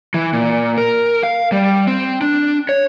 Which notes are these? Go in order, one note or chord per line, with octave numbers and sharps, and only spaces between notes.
E3
A#2
A#4
F5
G3
C4
D4
C#5